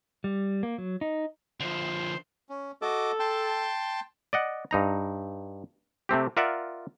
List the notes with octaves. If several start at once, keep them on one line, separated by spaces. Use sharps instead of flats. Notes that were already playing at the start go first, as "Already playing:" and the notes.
G3
A#3
F#3
D#4
D3 F3 C5
C#4
F#4 A4 D#5 D6
G5 A5 C6
D5 D#5 F#5
G2 D#4 A#5
C3 A3 C4 G4
F4 A#4 D5 E5 F#5